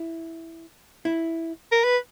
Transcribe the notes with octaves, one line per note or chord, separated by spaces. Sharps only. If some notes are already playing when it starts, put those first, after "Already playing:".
Already playing: E4
E4
A#4
B4